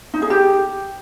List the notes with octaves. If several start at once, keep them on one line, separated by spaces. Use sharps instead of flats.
D#4
G#4
G4